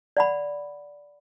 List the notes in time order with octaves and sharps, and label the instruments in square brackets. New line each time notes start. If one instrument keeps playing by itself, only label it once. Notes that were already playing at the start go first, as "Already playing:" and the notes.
[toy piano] D5 F#5 B5